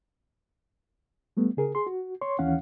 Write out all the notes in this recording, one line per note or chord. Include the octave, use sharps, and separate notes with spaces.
G3 A3 B3
C#3 G#4 A#4
G#4 C6
F#4
C#5 C6 C#6
D#2 E3 C#4 F5 F#5